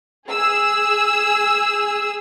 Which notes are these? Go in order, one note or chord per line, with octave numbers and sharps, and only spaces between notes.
G#4 E6